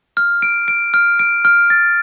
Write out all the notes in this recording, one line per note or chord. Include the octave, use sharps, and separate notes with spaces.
F6
D7
D7
F6
D7
F6
A6